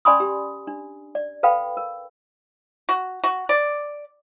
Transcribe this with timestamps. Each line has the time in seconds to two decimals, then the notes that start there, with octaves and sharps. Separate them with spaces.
0.05 C#4 D5 G#5 B5 C6 D#6
0.20 G4
0.67 D4
1.15 D5
1.43 A4 B4 F5 G5 B5
1.77 A#4
2.89 F#4
3.24 F#4
3.49 D5